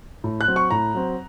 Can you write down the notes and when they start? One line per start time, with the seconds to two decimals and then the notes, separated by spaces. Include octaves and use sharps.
0.24 A2
0.41 F#6
0.48 F#3 C4
0.56 C#6
0.71 A2 A#5
0.95 F#3 C4